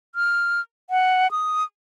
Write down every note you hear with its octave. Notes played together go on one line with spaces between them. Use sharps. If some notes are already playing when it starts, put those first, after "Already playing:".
F6
F#5
D#6